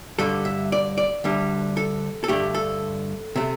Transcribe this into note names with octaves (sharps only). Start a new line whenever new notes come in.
G2 D3 G3 A4
E5
D5
D5
D2 D3 G3
A4
A4
G2 D3 A3 G4
A4
C3 A3